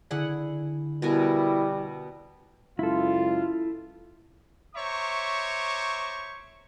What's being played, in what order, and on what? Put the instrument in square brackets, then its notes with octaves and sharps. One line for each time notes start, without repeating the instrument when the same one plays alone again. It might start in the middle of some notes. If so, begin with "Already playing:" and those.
[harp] D3 [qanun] E4 G#4 F#5
[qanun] B2 A#4 G#5 [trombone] G3 [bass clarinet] E4
[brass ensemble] C#2 F#2 F4 [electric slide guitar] E4 A4
[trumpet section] C5 C#5 E5 A#5 C#6 D6